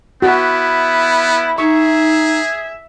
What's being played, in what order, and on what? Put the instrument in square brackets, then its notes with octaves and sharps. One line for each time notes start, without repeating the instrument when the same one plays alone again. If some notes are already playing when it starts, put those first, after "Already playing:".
[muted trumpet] B3 [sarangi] E4 [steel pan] F#4
[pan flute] D#4 [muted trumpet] G#4 [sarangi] E5 [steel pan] C#6